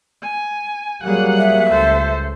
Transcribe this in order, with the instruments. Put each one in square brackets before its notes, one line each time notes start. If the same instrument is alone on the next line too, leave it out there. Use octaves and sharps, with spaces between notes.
[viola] G#5
[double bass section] F#3 G3 A#3 [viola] G#4 F#5
[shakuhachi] E5
[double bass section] C#2 [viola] A4 C5